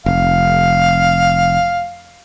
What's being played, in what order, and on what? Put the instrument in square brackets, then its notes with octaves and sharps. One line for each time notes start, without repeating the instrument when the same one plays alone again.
[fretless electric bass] F1 [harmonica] F5